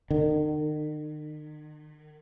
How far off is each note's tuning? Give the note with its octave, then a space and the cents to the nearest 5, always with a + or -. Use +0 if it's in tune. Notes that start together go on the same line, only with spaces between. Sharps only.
D#3 -40